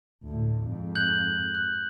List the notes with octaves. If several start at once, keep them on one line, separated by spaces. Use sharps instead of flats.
D2 A2
F2 G#2
F#6 G6 F#7
F#6